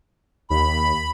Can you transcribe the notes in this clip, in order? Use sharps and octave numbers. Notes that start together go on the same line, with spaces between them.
D#2 B5